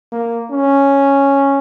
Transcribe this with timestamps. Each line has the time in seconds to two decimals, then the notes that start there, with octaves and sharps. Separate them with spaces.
0.12 A#3
0.51 C#4